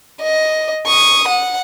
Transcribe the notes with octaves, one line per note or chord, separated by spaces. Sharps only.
D#5
C#6 D#6
F#5